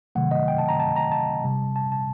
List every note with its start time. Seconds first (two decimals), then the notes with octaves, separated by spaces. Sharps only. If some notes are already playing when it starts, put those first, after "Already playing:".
0.15 C3 D#3 F#3 A3 F#5
0.31 D#5
0.48 G5
0.58 A5
0.69 A#5
0.80 A5
0.96 A#5
1.12 A5
1.44 C3 G3
1.76 A5
1.92 A5